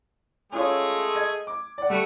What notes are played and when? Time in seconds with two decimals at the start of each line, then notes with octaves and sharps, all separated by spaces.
0.52 G#3 A3 C#4 F4 G#4 C#5
1.15 D#5 G#6
1.47 D6
1.78 D5 F#5
1.90 G3 A3 F#4